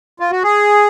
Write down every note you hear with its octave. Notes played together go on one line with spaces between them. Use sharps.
F4
F#4
G#4